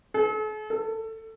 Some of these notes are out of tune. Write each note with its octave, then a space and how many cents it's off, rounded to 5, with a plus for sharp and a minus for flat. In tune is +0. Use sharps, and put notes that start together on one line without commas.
A4 -45
A4 +20